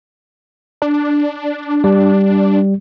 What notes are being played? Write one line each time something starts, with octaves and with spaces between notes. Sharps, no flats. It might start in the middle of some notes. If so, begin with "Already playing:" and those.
D4
G3